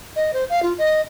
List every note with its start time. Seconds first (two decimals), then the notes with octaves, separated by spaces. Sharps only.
0.16 D#5
0.33 C5
0.50 F5
0.63 F4
0.78 D#5